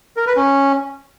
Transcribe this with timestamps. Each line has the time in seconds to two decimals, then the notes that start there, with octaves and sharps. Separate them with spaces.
0.17 A#4
0.26 B4
0.36 C#4